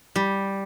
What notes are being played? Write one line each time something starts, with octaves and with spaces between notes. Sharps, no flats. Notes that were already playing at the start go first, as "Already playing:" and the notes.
G3